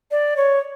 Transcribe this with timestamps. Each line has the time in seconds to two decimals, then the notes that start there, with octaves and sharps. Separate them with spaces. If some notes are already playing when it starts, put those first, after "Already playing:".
0.11 D5
0.37 C#5